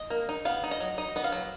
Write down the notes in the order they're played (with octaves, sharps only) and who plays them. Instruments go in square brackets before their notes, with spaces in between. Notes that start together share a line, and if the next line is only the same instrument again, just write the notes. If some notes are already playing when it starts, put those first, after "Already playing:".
Already playing: [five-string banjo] D#5
A#3
D#4
B3 F5
D#4
D#5
F#3
D#4 D#5
B3 D#5
F5
F#3